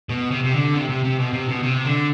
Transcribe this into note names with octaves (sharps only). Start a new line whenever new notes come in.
B2
C3
C3
D3
C3
C3
C3
B2
C3
B2
C3
D3